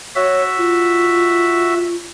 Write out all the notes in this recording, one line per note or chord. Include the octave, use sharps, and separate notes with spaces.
F#4 C#5 E5
F4